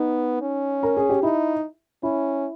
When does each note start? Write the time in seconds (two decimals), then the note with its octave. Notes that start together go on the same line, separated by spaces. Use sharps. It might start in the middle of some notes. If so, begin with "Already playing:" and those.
Already playing: B3 D#4
0.42 C#4
0.83 A#4
0.97 G#4
1.09 G4
1.23 D#4 E4
2.03 C#4 E4